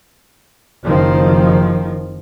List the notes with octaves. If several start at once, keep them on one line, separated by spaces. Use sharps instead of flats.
F#1 D#3 F3